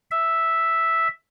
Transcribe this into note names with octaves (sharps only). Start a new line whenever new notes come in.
E5